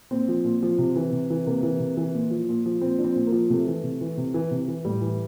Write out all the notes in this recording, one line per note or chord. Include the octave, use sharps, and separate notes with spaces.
A#2 C4
F3
A#2
F3
C3
E3
C3
E3
C3 A#3
E3
C3
E3
A#2
F3
A#2
F3
A#2 C4
F3 D4
C4
A#2
A#3
F3
C3 A3
E3
C3
E3
C3
E3
C3
E3
A2 G3
E3